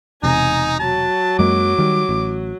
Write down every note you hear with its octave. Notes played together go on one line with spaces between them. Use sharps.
E1 C3 D#4 G#5 A#5
F#3 A5
F#2 G#3 A#3 D6
D#3 G3
A1